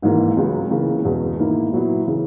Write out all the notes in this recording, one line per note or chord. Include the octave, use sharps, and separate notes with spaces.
G#1 G#2 E3 A#3
C#2 C#3 F#3
C#2 C#3 E3 A#3
E2 B2 G#3
G#2 D#3 A#3 E4
A#2 F#3 B3 E4
C#3 E3